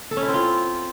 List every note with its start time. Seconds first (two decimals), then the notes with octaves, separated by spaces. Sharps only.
0.11 A4
0.17 C#4
0.22 E4
0.28 C4
0.34 F4